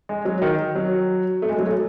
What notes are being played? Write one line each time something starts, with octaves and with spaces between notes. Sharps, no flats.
G#3
F#3
D#3
F#3
A3
G#3
F#3
A3